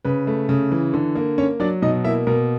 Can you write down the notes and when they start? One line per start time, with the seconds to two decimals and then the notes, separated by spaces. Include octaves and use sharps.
0.05 C#3 B4
0.27 A3
0.49 C#3
0.72 E3
0.94 D3
1.15 A#3
1.38 C#4 C#5
1.60 F#3 D4 D5
1.82 B2 D#4 D#5
2.05 A#3 E4 E5
2.27 B2 A#4